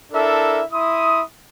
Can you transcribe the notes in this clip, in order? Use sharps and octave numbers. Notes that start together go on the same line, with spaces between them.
D4 E4 A4 A#4 E5
E4 C6 D#6